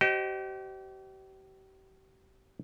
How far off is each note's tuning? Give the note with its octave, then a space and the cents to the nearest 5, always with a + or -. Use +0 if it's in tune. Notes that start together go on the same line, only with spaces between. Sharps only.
G4 -40 C5 +0 D#5 -10